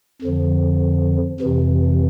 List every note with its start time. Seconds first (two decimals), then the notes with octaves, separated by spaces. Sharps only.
0.22 F2 D3 F3
1.40 F2 C3 E3